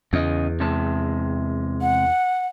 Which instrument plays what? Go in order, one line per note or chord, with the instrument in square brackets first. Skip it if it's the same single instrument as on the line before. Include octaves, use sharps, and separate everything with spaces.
[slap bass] E2 [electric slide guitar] C#3 D#5
[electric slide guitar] C3 G#3 A5
[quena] F#5